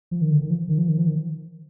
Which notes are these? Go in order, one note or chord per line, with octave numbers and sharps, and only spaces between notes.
F3
D#3
D3
D#3
F3
D#3
F3
D#3
F3
D#3